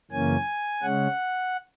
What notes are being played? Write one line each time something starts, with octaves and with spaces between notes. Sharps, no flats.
F#2 C#3 E3 A#3 C#4 G#5
C#3 G#3 C#4 F#5